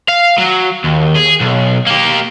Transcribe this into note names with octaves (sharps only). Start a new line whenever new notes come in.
F5
F#3
D#2
G#4
B1
A#3 G4